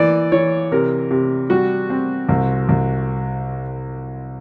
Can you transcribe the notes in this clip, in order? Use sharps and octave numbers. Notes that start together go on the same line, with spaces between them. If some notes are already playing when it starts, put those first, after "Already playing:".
Already playing: E3 A#3 D5
E3 C#5
C3 A#4
C3
G3 F#4
C4
C2
C2